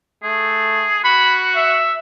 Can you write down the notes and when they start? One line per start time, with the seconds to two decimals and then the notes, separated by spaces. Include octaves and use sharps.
0.23 A3 G#4
1.04 F#4 B5
1.56 E5